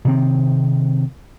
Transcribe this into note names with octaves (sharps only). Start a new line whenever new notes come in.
C3 D#3 C4